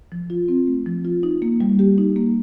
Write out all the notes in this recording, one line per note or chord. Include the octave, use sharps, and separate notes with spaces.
F3
F4
C4
A3
F3
F4
D#4
A#3
G3
G4
D#4
A#3